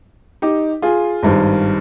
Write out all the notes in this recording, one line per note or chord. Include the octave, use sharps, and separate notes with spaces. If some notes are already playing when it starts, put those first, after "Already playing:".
D#4 G4
F4 G#4
G#1 G2 D#3